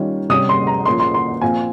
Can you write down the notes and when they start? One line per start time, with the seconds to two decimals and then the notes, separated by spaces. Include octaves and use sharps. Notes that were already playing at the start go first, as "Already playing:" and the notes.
Already playing: D#3 G3 C#4 F4
0.29 C3 G3 C#4 D#6
0.49 C6
0.67 A#5
0.85 A#2 F3 A#3 C#4 C6
0.99 C6
1.14 C6
1.41 A#2 F3 C4 F4 G#5